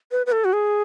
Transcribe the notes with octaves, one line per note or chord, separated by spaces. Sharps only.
B4
B4
A4
F#4
G#4